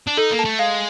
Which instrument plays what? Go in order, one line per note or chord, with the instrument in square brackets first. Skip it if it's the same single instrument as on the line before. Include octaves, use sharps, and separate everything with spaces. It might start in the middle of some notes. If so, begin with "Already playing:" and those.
[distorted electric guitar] D4
[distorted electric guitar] D#4 [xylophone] A4
[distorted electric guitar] A#3
[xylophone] A5
[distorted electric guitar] A3
[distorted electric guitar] G#3 [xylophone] F5